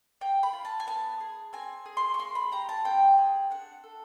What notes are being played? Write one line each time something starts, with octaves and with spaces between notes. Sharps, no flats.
A#3 G5
B5
F4
A5
G#5
B3 A5
G#4
C4 G#5
G#4
C6
C#6
A#3 C6
B5
G4 A#5
A5
C4 G5
G#4
D4 F#5
A4